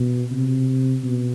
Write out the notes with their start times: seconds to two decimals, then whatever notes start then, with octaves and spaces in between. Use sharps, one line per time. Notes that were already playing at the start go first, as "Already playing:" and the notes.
Already playing: B2
0.32 C3
1.04 B2